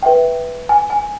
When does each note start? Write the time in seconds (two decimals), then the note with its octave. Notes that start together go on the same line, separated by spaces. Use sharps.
0.03 B4 E5 G5
0.69 G#5
0.90 G#5